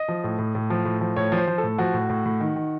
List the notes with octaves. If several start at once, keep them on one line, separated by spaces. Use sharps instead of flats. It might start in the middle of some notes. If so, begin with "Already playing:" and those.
Already playing: D#5
F3
A2
A2
A2
F3
A2
F3
A2 C#5
F3
C5
F3
A4
A2
F3 F#4
A2
A2
A2
D#3
D#3